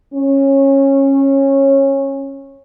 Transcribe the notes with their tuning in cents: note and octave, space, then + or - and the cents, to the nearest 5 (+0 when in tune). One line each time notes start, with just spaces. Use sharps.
C#4 -20